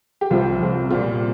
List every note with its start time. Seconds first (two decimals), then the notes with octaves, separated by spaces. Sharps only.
0.21 G4
0.31 C2 C3 F3 C4 F4
0.60 C2 C3 F3 C4
0.90 A#2 G3 C4 F4